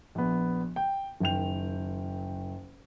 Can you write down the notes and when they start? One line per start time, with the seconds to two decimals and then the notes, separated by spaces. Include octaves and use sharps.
0.15 A#1 B3
0.76 G5
1.20 F#1 D#3 G5 F7